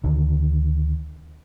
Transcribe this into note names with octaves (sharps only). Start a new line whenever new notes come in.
D2 D3 D#3